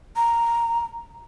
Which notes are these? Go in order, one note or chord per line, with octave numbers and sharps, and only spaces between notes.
A#5